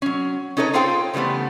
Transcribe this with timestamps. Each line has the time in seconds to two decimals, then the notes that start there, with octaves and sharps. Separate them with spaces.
0.02 F#3 C#4
0.57 C#4 D#4 A4 B4 C#5
0.73 F4 G#4 A4 C5 F5 G5
1.13 C#3 E3 G3 A3 B3